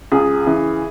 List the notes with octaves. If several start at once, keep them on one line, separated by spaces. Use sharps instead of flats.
C#2 G#4
C#3 E3